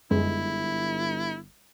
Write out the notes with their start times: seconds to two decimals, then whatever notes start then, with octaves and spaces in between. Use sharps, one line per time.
0.11 G1 F#2 G#3 E4